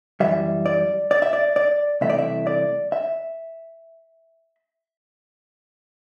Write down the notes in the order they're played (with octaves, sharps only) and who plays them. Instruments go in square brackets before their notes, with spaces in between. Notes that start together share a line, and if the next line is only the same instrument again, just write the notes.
[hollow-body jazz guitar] F#2 E3 G3 E5
D5
D5
E5
D5
D5
C2 C3 E3 A3 E5
D5
E5
D5
E5